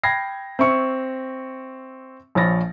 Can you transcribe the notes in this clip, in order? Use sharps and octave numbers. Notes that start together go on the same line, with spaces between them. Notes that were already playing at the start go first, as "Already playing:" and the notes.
G5 B5 G#6 A#6 C7
C4 E5 C#6 C#7
A#1 F3 C#5 B5 A6 A#6